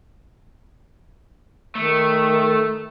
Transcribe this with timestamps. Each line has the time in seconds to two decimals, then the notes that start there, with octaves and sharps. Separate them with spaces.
1.75 D#3 A3